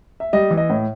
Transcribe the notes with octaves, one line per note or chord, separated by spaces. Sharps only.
E5
G3 D#5
E3
D#5
A2